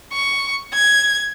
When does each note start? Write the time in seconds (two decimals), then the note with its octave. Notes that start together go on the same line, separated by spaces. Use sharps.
0.13 C#6
0.74 G#6